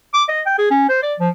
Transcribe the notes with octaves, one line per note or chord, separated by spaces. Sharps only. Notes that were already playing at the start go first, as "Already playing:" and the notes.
D6
D#5
G5
G#4
C#4
C5
D5
F3